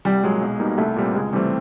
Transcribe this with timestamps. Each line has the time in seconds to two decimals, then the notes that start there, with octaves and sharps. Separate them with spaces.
0.05 C2 G3
0.23 A#2 F#3 G#3
0.41 B1
0.60 B2 G3 A#3 D#4
0.78 C2 A3
0.96 A#2 G3 C4
1.14 C#2 G#3
1.33 C3 E3 G3 A3 C4